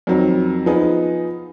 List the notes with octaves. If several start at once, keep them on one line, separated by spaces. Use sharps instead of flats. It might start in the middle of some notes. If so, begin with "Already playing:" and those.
F2 D#3 F#3
F3 B3 D#4 G#4